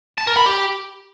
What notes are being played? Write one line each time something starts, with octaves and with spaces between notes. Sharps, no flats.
A5
A#4
B5
G4